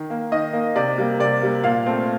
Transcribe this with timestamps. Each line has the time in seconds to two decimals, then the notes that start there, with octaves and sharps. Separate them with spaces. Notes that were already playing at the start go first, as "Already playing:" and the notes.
Already playing: D#3
0.10 A#3
0.32 D#3 D#5
0.53 A#3
0.76 C3 D5
0.98 G3 A#3
1.20 C3 D5
1.41 G3 A#3
1.64 A#2 F5
1.86 A3 C4